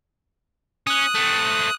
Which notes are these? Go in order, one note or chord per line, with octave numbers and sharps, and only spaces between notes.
C#4 D#6 F#6
A3 C4